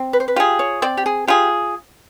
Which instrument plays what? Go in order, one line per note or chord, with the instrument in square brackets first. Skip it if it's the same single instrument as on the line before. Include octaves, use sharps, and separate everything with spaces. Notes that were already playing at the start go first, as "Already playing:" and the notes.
Already playing: [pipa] C4
[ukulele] B4
C5
B4
[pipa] F4 G#4 [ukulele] G4
[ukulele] C#5
[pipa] C4 [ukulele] D5
[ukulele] G4
G#4
[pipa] F4 G#4 [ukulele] G4